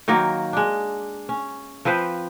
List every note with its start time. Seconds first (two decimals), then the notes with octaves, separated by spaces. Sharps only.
0.08 D#3 F#3 A#3 D#4
0.53 G#3 D4
1.29 C#4
1.85 F3 C4 B4 C5